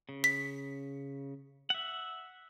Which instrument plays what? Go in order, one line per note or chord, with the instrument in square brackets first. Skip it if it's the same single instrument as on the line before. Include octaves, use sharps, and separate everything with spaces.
[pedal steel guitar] C#3
[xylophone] B6
[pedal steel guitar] E5 F#5